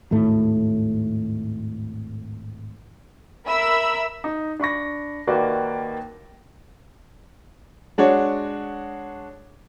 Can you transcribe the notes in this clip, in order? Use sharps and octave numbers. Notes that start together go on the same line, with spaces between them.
G#1 D#2 A2 A3
A#4 E5 B5 E6
D#4
D4 B5 C#6 A#6
D#2 D#3 A#3 F#4 B4 D5
G#3 D4 F#4 C#5